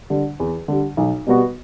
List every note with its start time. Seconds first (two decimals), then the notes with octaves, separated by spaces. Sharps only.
0.10 D3 G3
0.40 E2
0.68 D3 G3
0.97 B1
1.27 B2 G3 B3 F#4